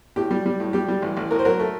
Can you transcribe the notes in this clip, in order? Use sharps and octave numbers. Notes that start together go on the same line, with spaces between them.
A2 G4
G3
G3
A2
G3 G4
G3
A1
A1
A2 A#4
C5
F#3 A#4
A3